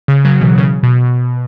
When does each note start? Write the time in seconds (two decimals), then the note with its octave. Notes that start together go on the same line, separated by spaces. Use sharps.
0.08 C#3
0.25 C#3 F#3
0.41 B2 E3
0.58 C#3
0.83 B2